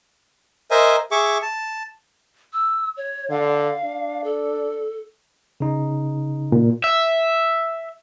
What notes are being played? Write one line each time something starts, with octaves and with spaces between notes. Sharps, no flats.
A#4 C5 D#5 E5 G#5
G#4 E5 C#6 D6
A5
E6
C#5
D3 F5
D4
A4
C#3 D#4
A#2
E5